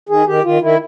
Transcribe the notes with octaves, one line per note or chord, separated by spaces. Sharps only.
D#3 G#4
D#3 G4
D#3 F4
D#3 E4